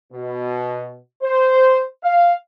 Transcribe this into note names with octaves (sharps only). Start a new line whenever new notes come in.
B2
C5
F5